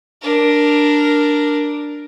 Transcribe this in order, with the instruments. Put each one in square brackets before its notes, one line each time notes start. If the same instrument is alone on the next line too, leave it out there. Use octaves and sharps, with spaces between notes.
[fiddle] D4 A#4